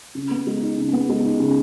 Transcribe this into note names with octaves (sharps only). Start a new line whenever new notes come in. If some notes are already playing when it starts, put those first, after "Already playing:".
C#3
B3
G#3
D#4
C#3
B3
G#3
D#4
C#3